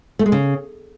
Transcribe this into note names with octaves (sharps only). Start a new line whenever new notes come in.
A3
G#3
C#3